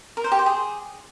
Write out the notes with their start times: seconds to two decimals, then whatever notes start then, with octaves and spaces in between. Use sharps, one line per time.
0.17 A#4
0.24 C5
0.32 G4
0.39 C5
0.46 G#4